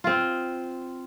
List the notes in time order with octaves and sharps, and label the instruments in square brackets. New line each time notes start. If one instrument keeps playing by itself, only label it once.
[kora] C4 F4